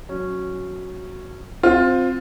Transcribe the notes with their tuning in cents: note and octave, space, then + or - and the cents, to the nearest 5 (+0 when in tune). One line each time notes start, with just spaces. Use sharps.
F#3 +0 C#4 -5
C4 +0 F4 +20